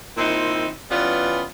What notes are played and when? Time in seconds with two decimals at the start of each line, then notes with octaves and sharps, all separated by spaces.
0.17 A#2 D#3 C4 D#4 E4
0.90 E3 G3 B3 C#4 F4